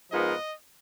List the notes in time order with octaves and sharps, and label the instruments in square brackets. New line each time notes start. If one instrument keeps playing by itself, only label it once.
[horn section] G#2 F3 B3 F4 A#4 [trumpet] D#5